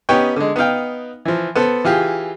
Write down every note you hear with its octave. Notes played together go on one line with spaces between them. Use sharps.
B3 C#4 D#4 G4 C#5 G5
D3 G#3
B3 D#4 F5 G5
E3 F3
B3 A4 C5
E3 F4 G4 G#4